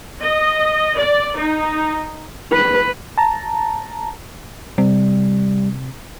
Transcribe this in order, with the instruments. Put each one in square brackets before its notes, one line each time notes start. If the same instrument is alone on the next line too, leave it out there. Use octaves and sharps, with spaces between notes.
[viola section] D#5
D5
D#4
[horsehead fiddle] B4
[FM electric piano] A5 A#5
[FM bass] C3 [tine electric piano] G3